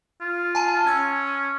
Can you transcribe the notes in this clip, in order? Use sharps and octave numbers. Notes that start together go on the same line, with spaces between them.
F4
G#5 A5 D#7
C#4 E6 G#6